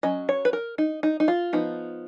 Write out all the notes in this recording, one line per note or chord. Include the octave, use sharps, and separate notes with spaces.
F#3 C#4 D#5
C#5
B4
A#4
D#4
D#4
D#4
F4
F3 B3 D#4